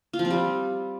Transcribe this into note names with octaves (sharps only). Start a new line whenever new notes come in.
F4
F3
C4
G3